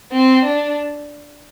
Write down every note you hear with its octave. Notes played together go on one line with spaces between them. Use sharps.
C4
D4